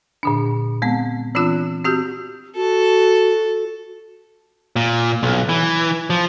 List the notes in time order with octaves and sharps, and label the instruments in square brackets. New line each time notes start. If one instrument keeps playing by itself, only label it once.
[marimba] A#2 D3 D4
G#3 B3 C4
E3 C4 D4 F4 E6 F#6
C4 F#4 G4 G6
[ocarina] F#4 [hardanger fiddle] A4
[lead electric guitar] A#2
B1
E3
F3